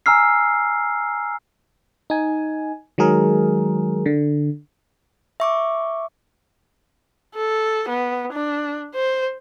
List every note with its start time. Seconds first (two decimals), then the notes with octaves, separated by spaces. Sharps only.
0.06 G#5 A#5 E6 F6 C7
2.10 D#4 G#5
2.98 D#3 F#3 G#3 G#4 A#4
4.06 D3
5.40 E5 C#6 D6
7.35 A4
7.88 B3
8.33 D4
8.95 C5